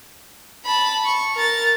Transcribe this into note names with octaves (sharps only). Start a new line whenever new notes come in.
A5 B5
C#6
A#4 A6